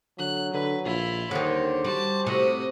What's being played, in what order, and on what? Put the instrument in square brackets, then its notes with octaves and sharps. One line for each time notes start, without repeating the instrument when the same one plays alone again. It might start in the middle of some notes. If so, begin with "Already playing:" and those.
[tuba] D3 [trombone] F#3 [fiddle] F#6
[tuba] D3 [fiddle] B4
[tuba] A#1 [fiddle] E4 F4
[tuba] D#2 [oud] D3 D#3 [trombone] C5 [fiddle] C#5
[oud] G3 [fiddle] F#4 A5
[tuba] A2 [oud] C3 [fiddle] F#4 D#5